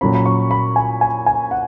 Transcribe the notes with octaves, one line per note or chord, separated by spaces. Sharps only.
A#2 F#3 C#4 B5
B5
C#6
B5
G#5
G#5
G#5
F#5